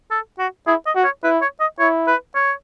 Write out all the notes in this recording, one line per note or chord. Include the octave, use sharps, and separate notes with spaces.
A4
F#4
E4 G#4
D#5
F#4
C#5
E4 B4
C#5
D#5
E4 C#5
B4
C#5